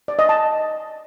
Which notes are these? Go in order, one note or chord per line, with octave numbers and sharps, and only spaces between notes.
D5
D#5
A5